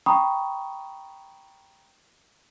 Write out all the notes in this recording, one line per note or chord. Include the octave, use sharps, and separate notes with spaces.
G5 A#5 B5 C#6 D#6